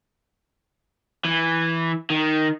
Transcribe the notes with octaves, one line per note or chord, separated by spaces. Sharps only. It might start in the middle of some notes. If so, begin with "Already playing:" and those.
E3
D#3